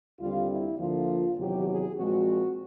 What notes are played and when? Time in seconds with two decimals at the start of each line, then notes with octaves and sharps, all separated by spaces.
0.20 D#2 D3 G3 C4 F4
0.50 E4
0.79 D2 D3 F3 A#3 F4
1.38 E2 C3 D#3 F#3 G4
1.67 G#4
1.97 A#2 F3 G#3 C4 F#4